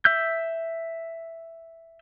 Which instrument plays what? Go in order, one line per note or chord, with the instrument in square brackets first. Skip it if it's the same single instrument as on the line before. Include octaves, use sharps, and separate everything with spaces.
[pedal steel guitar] E5 E6 G6